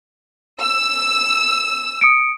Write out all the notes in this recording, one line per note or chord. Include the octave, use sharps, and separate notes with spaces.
E6
D#6 C#7 D7